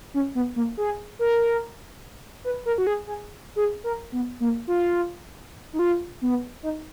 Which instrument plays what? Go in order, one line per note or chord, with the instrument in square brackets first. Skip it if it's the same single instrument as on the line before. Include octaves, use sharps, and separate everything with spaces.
[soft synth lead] C#4
B3
A#3
G#4
A#4
B4
A#4
F#4
G#4
G#4
G#4
A#4
B3
A#3
F4
D#4
F4
B3
D#4